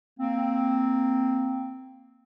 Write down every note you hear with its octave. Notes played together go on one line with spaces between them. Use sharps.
A#3 C4